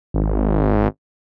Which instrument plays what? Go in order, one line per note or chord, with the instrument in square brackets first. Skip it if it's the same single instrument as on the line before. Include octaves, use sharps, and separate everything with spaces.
[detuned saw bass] G#1